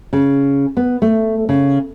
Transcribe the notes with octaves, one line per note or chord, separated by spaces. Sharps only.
C#3
B3
A3
C#3